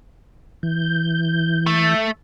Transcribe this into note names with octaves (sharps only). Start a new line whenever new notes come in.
E3 G6
A3